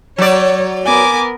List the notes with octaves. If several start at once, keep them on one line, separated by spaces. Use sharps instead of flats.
F#3 C#5 D5
B3 A#4 G#5 D6